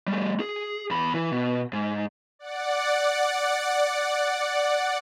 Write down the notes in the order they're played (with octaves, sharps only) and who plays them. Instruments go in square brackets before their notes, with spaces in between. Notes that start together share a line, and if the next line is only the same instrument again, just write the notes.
[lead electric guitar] G3 A3
G#4
E2 B5
E3
B2
G#2
[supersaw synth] D5 F#5